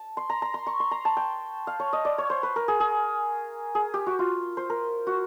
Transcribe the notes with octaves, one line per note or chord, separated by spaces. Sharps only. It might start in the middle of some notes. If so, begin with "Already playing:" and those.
Already playing: A5
C6
A#5
A#5
C6
C#6
C6
A#5
A5
G5
F5
C#5
D#5
D5
C#5
C5
B4
A#4
G#4
G#4
G#4
G4
F#4
F4
C5
A#4
F#4